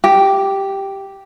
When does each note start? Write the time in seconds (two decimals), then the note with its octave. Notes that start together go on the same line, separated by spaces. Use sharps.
0.04 G4